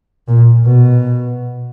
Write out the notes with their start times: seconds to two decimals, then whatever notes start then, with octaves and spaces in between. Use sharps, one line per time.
0.28 A#2
0.65 B2